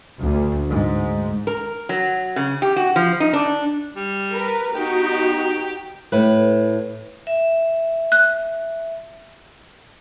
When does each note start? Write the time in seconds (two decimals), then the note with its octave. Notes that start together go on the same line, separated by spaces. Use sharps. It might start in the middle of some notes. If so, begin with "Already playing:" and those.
0.19 D2
0.71 G#2
1.47 A#4
1.89 F#3
2.36 C#3
2.62 G4
2.76 F#4
2.96 F3
3.20 D#4
3.33 D4
3.96 G3
4.32 A#4 B4
4.75 B3 D#4 F#4 G4
6.12 A2 B4
7.27 E5
8.12 F#6